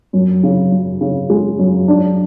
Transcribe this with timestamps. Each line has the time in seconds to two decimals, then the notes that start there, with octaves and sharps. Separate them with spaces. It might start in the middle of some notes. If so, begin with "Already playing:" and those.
0.13 F#2
0.43 C#3
0.72 F#2
1.01 C#3
1.29 G#3
1.59 F#2
1.88 D4